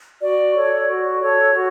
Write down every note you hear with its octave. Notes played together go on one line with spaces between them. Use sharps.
F#4 D5
A4 C#5
F#4
A4 C#5
F#4